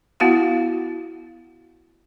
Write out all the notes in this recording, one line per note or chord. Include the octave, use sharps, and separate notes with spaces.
B3 E4 F#4 F5 F#5